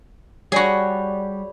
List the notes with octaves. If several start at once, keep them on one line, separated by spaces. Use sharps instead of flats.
G3 F#4 G#4 C#5 D5 B5